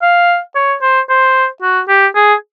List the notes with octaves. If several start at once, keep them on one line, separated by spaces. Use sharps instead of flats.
F5
C#5
C5
C5
F#4
G4
G#4